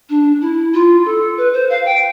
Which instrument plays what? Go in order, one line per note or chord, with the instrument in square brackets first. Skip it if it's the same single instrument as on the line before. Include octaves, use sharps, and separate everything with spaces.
[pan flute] D4
E4
F4
A4
B4
C5
F5
G5